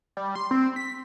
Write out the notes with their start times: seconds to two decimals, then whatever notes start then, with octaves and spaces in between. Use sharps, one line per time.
0.17 G3
0.35 C6
0.51 C4
0.76 B6